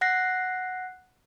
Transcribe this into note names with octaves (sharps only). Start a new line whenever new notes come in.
F#5 F#6 A#6 C7